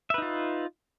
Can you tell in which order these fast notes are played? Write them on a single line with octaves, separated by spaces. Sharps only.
E5 B4 D#4 F4